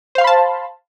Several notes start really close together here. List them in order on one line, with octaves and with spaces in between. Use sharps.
C5 F5 C6 B5 A5